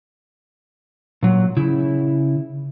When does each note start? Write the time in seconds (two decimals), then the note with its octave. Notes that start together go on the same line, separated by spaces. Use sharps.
1.23 A#2 F#3
1.57 C#3 E4